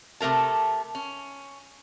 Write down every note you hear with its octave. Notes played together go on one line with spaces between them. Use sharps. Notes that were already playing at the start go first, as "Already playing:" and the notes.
C3 A3 A#4 A5
C#4